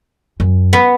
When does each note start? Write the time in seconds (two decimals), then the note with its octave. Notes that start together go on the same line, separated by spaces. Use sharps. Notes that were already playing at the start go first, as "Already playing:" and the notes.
0.40 F#2
0.73 B3